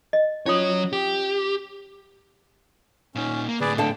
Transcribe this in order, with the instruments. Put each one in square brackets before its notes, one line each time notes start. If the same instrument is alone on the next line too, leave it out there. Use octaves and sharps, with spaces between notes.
[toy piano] D#5
[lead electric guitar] F#3 C#5 [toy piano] C#4 F4 D#6
[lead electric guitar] G4
[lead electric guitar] A#2 D#4 [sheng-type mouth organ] C#4
[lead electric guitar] A#3
[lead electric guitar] D2 A2 [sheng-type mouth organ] G#4 B4 D5
[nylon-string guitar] D3 F5 A5 [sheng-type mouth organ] G5